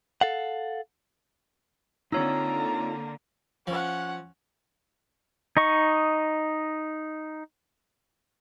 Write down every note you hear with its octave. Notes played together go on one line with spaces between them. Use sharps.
A4 F5 F#5
D3 A#3 C4 D#4 F4 C#5 A#5 E6
F3 C#4 F#5
D#4 D#5 C#6